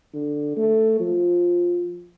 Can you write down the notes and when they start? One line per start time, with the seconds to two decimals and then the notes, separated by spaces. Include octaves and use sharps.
0.14 D3
0.57 A3
1.00 F3